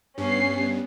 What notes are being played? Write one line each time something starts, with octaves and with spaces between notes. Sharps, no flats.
G2 B3 C#4 C7